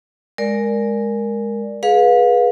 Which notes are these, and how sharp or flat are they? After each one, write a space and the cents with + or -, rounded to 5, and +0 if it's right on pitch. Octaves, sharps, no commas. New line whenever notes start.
G#3 +0 A#4 +0 D5 +0
G#4 +10 B4 -15 F5 +30